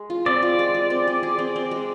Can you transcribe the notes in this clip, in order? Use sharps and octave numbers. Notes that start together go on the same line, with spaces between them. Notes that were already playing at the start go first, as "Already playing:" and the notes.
Already playing: G#3
F4
C4 D5
F4
G#3
G#3
C4
G#4
G#4
C4
C4
G#3